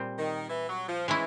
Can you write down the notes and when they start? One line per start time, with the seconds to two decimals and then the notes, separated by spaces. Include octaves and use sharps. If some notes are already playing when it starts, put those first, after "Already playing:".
Already playing: A#2 G3 C4
0.18 D#3
0.49 E3
0.69 F#3
0.88 F3
1.08 E3 G#3 C#4 E4